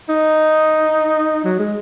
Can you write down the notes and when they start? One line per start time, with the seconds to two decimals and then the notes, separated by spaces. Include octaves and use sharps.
0.09 D#4
1.45 F#3
1.59 G#3